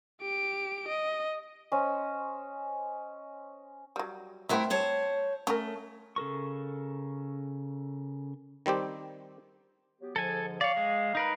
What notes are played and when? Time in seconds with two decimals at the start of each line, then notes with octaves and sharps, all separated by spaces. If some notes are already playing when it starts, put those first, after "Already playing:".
0.22 G4 D7
0.88 D#5
1.72 C#4 C5 D#5
3.96 F#3 G3
4.49 A3 C4 E4 A#4 B4 E5
4.70 C5 C#5 A5
5.47 A3 C#4 A#4
6.16 C#3 A4 A#4 C#6
8.66 D#3 G3 C4 G4
10.01 F#3 B3 G4
10.16 G#2 D3 F3 A4 G#5
10.61 C#5 D5 F5
10.77 G#3
11.15 D#4 A#4 B4